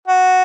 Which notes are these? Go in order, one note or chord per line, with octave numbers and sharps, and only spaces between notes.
F#4